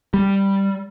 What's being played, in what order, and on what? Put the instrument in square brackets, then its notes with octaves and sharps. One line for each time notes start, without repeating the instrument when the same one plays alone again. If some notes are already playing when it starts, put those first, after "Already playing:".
[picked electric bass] G3